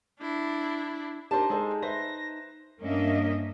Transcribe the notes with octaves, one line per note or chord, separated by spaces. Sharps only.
D4 E4
D4 D#4 G4 A#4 C5 A5
G#3 G#4 A4 C5
B4 C5 E5 A#6
G2 A#3 C#4 D4 D#5 E5